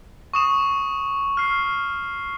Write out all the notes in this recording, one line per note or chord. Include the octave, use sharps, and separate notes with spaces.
C#6 D#6 E7
F6 C7